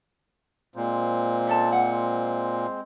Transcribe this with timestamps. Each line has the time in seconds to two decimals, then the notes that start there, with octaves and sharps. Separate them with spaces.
0.76 A#2 G#3 C4 C5
1.47 C#4 A4 A5
1.72 F#5